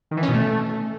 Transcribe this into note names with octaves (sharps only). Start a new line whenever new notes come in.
D#3
E3
C#4
B2
A3